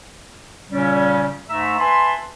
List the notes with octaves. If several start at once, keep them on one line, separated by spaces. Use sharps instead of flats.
A#2 C#3 G3 C#4
G#2 A3 E5 A#5
B4 E5 G#5 A5 B5 C6